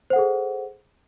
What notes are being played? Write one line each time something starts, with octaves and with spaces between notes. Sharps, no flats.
G#4 A4 C5 F#5